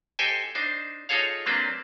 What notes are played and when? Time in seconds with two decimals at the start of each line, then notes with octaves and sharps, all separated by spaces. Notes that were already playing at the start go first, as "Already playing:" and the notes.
0.19 G4 A4 C5 D#5 G5 G#5
0.55 D4 D#4 C5
1.09 D#4 F4 G#4 A4 C#5 F5
1.46 F#3 A#3 C4 D4 B4 C5